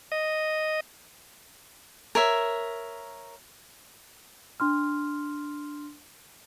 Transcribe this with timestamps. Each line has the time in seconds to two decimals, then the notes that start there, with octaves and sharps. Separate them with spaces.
0.12 D#5
2.15 A#4 C#5 E5
4.60 D4 C6 F6